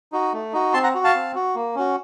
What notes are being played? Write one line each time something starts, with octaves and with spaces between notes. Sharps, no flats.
D#4 F#4
A3
D#4 F#4
C4 A5 C6
F#5 A#5
F#4
F5 A5
C4
F#4
A#3
C#4 F#4